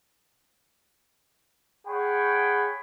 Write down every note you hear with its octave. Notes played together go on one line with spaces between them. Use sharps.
G#4 C#5 F#5 G5 B5 C#6